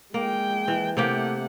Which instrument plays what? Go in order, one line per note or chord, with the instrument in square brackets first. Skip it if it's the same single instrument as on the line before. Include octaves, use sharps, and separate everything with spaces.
[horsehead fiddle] G#3 G5 [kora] A#3
[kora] E3
[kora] C3 A#3 G4 [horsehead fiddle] A3 F#5